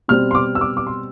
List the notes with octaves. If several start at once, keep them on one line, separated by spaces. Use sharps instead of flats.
B2 G3 C4 F6
C6
D6
E6
D6
D6
C6